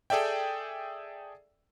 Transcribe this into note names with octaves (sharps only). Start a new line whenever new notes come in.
G#4 A4 D5 E5 G5